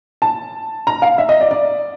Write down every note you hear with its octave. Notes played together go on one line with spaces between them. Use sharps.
A5
A#5
F5
E5
D#5
D5
D5